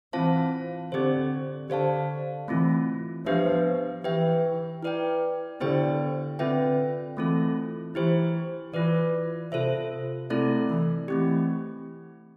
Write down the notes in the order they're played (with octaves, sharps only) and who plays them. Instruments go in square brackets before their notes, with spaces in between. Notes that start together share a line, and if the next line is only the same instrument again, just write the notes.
[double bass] E3 [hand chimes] C4 F4 C5 F5 A5
[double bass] D3 [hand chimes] C4 G4 C5
[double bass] D3 [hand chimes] G4 C5 F5 A5
[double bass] E3 [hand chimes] A3 C4 F4
[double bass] F3 [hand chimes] B3 D4 G4 B4 E5
[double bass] E3 [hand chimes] G4 B4 E5 G5
[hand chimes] E4 B4 D5 G5
[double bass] D3 [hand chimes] B3 E4 G4 C5 G5
[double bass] D3 [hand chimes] C4 F4 B4 E5 G5
[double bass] E3 [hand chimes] A3 C4 F4 A4
[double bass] E3 [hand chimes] E4 G4 C5
[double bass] E3 [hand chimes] F4 B4 D5
[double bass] C3 [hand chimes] F4 A4 C5 E5
[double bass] C3 [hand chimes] A3 C4 E4 A4 D5
[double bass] E3
[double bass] E3 [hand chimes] A3 C4 G4